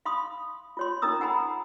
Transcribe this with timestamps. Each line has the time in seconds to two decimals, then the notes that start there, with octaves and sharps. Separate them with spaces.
0.05 F5 B5 C6 D#6
0.77 F4 C#5 C6
1.02 C#4 D#4 A#4 A#5 D#6 E6
1.21 F#5 G#5 A#5 B5